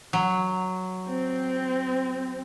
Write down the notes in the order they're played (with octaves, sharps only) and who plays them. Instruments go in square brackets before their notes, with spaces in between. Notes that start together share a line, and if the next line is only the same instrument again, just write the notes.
[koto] F#3
[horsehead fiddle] C4